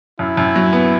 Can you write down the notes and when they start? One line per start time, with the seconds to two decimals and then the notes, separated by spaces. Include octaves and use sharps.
0.19 F#2 E4
0.37 F#2
0.55 F#3
0.73 B3